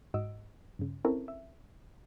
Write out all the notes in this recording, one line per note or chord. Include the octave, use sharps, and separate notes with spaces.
G#2 F#4 D#5 E6 D7
G2 C#3
C4 C#4 E4 A4 A#4 C#5
E5